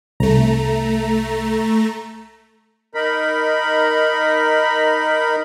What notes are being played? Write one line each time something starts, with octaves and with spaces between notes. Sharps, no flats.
C2 A3 A#5
D#4 A#4 B5